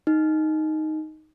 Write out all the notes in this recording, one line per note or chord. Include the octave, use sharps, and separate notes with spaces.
D#4